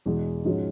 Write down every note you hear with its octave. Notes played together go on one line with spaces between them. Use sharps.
E2 B2 G#3
G#2 F3 G#3 C#4 F#4